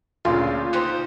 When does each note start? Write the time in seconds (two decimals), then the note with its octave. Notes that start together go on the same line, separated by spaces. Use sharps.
0.25 D2 A#2 C#3 F4 C6
0.73 D#4 G4 C5 F#6